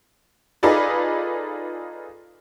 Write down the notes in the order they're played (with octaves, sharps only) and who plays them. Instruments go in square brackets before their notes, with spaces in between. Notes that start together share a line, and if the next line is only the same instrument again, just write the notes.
[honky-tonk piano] D#4 F4 G#4 A4 B4 D5